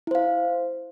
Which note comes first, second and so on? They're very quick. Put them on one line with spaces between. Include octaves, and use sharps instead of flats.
E4 C5 F5